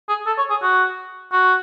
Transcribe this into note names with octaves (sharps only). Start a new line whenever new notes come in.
G#4
A4
C#5
G#4
F#4
F#4